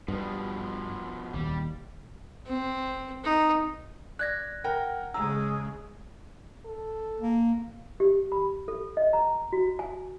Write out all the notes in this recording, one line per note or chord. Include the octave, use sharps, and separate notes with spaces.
G2 B2 F3
D#1 D#2 G3
C4
D#4
D5 F#6 G#6 A#6
A#4 F#5 G5
C#3 G#3 A#5 E6
A4
A#3
G4
B5
A4
D#5
A#5
F#4
G#5